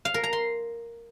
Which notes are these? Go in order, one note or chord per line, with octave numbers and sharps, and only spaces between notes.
F5
A#4
A#5
C6